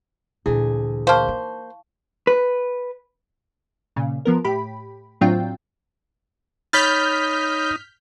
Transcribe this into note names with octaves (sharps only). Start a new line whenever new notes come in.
D2 A#2 E3 E4 G#4
A#3 C5 F5 A5 C#6
D#4
B4
A#2 C#3
F3 B3 A#4
A2 G4 B5
A2 F#3 C4 D4 F4 G5
D#4 C#5 B5 F6 G6 A6 B6